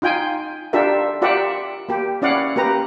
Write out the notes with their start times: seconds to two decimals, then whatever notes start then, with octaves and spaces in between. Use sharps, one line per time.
0.02 D#4 F4 G5 G#5
0.73 D4 F4 G4 A4 A#4 E5
1.22 F4 G4 A#4 D5 E5 F#5
1.89 A#3 G4
2.22 C#4 E4 D5 F5 F#5
2.56 A#3 G4 B4 A#5